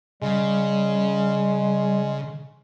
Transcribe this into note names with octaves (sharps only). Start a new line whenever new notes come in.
C#3 G3 G#3